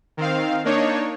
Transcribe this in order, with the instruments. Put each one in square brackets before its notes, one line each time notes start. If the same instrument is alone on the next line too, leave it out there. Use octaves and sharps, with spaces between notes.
[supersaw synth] D#3 C4 F5
A#3 D4 D#4 C#5